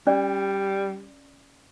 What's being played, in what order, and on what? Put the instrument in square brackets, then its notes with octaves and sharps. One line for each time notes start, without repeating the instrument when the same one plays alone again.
[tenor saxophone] G3 [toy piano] C#4 D5